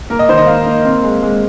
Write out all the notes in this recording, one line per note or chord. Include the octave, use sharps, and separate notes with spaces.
A#3 A#4
D#5
D#3 C5
D#5
A#3 F5
A#3
C4
G#3
G#3